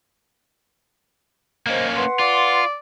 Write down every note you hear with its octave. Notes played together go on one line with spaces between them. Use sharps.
A#3 C#4 C5 D#5
B4 F#5 C6
F4 D5